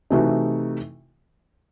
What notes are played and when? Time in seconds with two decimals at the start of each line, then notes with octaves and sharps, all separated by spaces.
0.10 C3 E3 A3 D#4 F#4